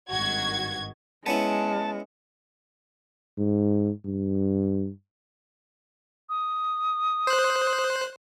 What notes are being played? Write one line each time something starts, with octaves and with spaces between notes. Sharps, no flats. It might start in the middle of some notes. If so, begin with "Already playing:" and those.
G#1 G2 D#3 F#4 G#6
G#3 B3 C#4 E4 A5
G#2
G2
D#6
C5 F#6